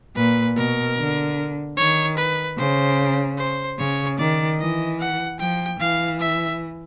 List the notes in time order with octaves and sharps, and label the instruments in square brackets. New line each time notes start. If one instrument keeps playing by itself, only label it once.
[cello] A#2 [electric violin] B4
[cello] B2 [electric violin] A#4
[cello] D3
[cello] D#3 [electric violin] C#5
[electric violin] B4
[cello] C#3 [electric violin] C5
[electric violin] C5
[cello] C#3 [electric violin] C#5
[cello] D#3 [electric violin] D5
[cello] E3 [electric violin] D#5
[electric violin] F#5
[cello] F3 [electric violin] G5
[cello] E3 [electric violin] F5
[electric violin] E5